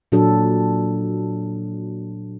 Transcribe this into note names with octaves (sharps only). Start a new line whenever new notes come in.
A#2 F#3 D4 A4